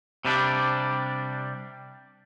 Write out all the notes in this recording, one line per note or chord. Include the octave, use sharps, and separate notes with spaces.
C3 G3 D4